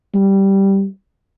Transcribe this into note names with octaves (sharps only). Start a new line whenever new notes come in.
G3